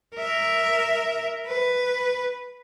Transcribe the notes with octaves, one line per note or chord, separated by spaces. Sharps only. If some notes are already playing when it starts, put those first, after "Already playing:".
A#4 E5
B4